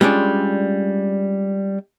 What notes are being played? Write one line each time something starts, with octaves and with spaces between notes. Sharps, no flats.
G3 G#3 C#4 D4 F4